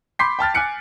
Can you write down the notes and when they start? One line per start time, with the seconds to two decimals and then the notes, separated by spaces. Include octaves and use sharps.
0.19 B5 C6 D6 G6 B6 C7
0.39 G5 A5 F6 A6
0.54 G#5 D6 F6 F#6 C#7 D7